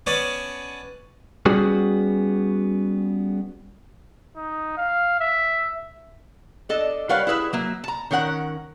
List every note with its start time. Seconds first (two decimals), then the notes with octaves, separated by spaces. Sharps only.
0.06 B3 C#4 D5 F#5 G#5 A5
1.46 G3 B3 C#4 F#4 G#4
4.36 D#4
4.77 F5
5.20 E5
6.69 D4 A4 D#5
7.09 G3 A#4 B4 C#5 F5 F#5
7.27 E4 G#4 B4 E5
7.53 F#3 A#3 E5
7.84 A5 A#5
8.11 D#3 C#4 A#4 F#5 A#5